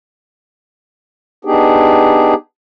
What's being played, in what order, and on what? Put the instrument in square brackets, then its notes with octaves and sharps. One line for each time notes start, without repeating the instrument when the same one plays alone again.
[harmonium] B3 D4 D#4 G4 G#4